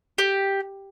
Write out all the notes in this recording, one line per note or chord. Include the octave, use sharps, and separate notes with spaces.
G4